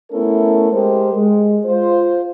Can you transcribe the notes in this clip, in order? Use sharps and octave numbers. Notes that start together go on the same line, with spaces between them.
A3 B3 C#4 E4 A4 A#4
G#3 G4 A#4 C5
G#3
F4 C5